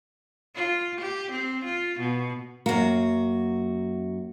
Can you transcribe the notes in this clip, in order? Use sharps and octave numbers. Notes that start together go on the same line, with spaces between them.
F4
G4
C4
F4
B2
F#2 A#3 F#4